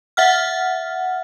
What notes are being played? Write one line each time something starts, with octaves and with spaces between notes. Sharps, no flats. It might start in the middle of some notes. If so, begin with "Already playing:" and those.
E5 F#5 F6